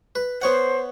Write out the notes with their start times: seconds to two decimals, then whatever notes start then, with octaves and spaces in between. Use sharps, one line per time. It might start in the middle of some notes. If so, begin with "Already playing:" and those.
0.15 B4
0.42 B3 C5 C#5 F#5